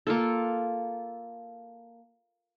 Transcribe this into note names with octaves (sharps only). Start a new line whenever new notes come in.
A#3 F4 A4